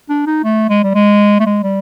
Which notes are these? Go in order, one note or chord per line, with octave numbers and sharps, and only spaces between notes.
D4
D#4
A3
G#3
G3
G#3
A3
G#3
G3